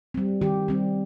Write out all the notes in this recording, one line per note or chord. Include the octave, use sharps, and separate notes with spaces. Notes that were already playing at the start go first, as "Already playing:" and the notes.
G3 C4
D#3 G4
G3 C4